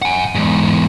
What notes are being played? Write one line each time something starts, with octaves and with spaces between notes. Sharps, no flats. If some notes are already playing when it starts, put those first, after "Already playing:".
F#5 G#5
E2 G#2